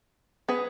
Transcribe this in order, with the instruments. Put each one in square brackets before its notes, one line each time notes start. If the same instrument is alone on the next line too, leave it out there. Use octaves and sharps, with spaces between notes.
[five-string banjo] B3 G#4 B4